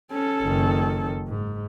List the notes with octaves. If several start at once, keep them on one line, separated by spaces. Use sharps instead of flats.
C#4 A4
F#1 D#3
G#2